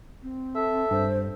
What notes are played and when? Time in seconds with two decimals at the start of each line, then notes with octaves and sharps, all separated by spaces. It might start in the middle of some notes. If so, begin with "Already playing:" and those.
0.23 C4
0.55 A4 E5
0.91 G2 C5